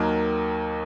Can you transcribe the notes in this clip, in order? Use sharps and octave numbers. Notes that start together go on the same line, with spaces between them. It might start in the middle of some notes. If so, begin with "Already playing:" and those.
Already playing: D#2 D#3 F#3 A#4